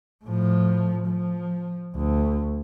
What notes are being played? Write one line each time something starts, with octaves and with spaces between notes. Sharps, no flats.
A2 F3
F3
D2